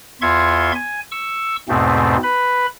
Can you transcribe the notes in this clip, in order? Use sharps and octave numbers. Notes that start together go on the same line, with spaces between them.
E2 F4 E5 C6 C#6 G#6
G#5
C#6 E6
E2 G#2 B2 A3 C4
B4 B5